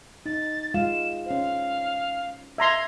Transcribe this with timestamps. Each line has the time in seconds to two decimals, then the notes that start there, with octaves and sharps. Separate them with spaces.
0.26 D#4 A6
0.74 G#3 F4 F5 E7
1.26 C#4 C5 F5
2.58 E5 A#5 C6 G#6